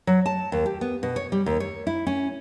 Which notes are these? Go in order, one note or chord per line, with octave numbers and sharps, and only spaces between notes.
F#3
A5
D#2
G4
B3
B2
C#5
G3
D#2
C#5
E4
C#4